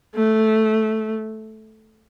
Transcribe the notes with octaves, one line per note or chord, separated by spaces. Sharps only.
A3